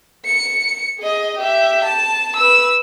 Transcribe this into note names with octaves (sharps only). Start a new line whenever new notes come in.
C#7
G#4 D#5
G4 E5
A5
B4 E6